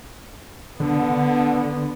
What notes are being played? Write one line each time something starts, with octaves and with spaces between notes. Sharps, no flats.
D3 B3